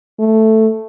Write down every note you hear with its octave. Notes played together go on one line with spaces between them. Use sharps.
A3